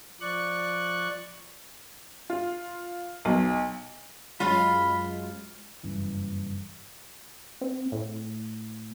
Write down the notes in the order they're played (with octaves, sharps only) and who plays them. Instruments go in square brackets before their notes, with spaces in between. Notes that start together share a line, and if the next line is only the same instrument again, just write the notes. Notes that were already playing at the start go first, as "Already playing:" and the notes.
[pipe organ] F3 D5 C#6 F#6
[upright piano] F4
B1
[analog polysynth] F#2 F#3 G#3 [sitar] F4 [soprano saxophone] B5
[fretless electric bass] F#1 G2 C#3 E3
[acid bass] C4
A2